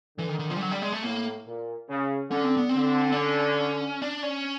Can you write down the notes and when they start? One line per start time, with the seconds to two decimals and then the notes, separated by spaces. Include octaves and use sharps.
0.18 D3 E3
0.29 D#3
0.39 D#3
0.50 F3
0.56 G3
0.61 F#3
0.71 G3
0.82 G#3
0.92 A3
1.03 A2 A#3
1.46 A#2
1.89 C#3
2.31 D3 C#4
2.44 C4
2.57 B3
2.69 D3 C4
3.12 D4
3.17 C#4
4.02 D4
4.23 C#4